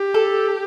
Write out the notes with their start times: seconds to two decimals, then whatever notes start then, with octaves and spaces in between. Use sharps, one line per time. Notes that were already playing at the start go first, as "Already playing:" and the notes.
Already playing: G4
0.14 A4